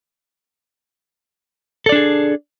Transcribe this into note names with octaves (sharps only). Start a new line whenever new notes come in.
D4 G#4 A4 D5